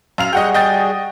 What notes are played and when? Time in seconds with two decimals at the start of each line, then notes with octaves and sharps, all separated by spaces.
0.18 F#2 F5 F7
0.33 G3 F#4 G#4 D#5 F#5 G5
0.54 D#5 G5 A6